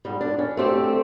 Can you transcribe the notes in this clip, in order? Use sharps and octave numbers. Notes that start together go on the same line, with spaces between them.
G#2 G3
D4
C#4
A3 C4 G4